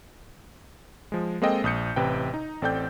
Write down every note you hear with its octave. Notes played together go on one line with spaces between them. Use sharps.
F3 G#3
G#3 A#3 C4 A4 D#5 G5
A#1 D#6 G6 C#7
A1 C3 B4 G5
D#4
A1 C4 A4 D5 G5 G6